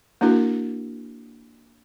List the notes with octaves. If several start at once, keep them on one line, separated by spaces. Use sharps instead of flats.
A#3 D4 E4 F#4 A#4